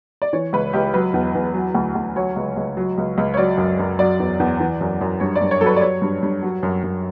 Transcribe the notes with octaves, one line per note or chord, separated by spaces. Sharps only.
D5
E3 C#5
C#2 B4
C#2 G4
F#3 B4
E2
E2
F#3
D2
D2
F#3 C#5
C#2
C#2
F#3
C#2
C#2
C#5
F#3 D5
F#2
F#2
F#3 D5
E2
E2
E3
F#2
F#2
G2 C#5
D5
G2
C#5
F#3 A4
B4
D5
F#3 C#5
G2
G2
F#3
F#2
F#2